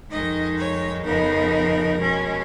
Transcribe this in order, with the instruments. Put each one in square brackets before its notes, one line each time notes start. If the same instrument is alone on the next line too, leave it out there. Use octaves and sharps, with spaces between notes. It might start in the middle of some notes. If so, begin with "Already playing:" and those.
[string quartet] F2 D#3 G#3 D#4 D#5
C#5
F2 C#3 F3 B3 D#4 A#4
B2 G#3 C#4